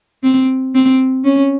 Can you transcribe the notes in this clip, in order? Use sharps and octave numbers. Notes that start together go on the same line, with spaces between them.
C4
C4
C#4